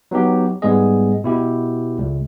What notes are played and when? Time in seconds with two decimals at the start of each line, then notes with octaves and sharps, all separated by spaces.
0.11 F#3 B3 D#4 G4
0.62 G#2 G3 G#3 B3 G#4 D#5
1.24 B2 E4 G4
1.98 C#2